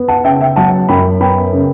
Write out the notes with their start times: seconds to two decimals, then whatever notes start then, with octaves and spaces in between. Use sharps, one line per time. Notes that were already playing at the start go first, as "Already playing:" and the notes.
Already playing: B3
0.08 F#5 A5
0.24 C#3 E5 G5
0.41 E5 G5
0.56 F#3 F#5 A5
0.89 F#2 G5 B5
1.20 B3 G5 B5
1.53 C#3